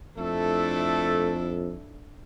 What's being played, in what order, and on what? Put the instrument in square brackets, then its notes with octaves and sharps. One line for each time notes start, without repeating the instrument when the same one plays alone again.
[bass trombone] F2 [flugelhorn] A3 [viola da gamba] D4 E4 A4